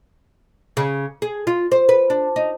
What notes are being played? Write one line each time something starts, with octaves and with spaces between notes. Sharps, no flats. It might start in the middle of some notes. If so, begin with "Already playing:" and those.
C#3
G#4
F4
C5
B4
D4
D#4